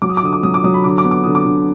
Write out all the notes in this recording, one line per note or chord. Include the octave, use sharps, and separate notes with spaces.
F#3 D6
D#6
D6
D3 D#6
D6
F#3 D#6
D6
F#3 D#6
B5
D3 D6
D6
B3
D6
D3 D#6
D6
D3